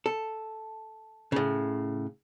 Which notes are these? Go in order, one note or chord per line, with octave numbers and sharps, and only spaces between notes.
A4
A2 C#3